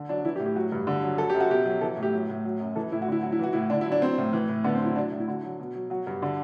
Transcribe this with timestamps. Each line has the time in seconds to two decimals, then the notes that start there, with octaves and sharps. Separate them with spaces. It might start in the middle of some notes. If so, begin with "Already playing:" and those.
Already playing: D3
0.09 F#3 D4
0.25 E3 E4
0.36 G4
0.40 A2
0.46 G4
0.55 F#3 F#4
0.72 G2
0.87 D3
1.02 F#3
1.18 F#3 A4
1.30 F#2 G4
1.40 F#4
1.50 B2 G4
1.65 F#3
1.81 E3 A4
1.97 A2
2.03 G4
2.13 F#3
2.29 A2
2.45 F#3
2.60 F#2
2.76 E3 A4
2.92 A2 E4
3.02 F#4
3.08 D3 E4
3.23 F#3 F#4
3.32 E4
3.39 E3 F#4
3.53 A2 E4
3.70 D3 D4
3.81 E4
3.86 F#3
3.92 D4
4.02 F#3 C4
4.18 A2
4.33 E3
4.49 A2
4.64 D3 B3
4.75 C4
4.80 F#3 E4
4.96 F#3 D4
5.11 A2
5.20 E4
5.28 D3 F#4
5.43 F#3
5.60 B2
5.75 F#3
5.90 F#3 F#4
6.07 G2
6.22 D3